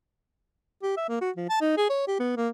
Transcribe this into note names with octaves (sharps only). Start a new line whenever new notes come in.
G4
E5
A#3
F#4
F3
A5
D#4
G#4
C#5
G4
B3
A#3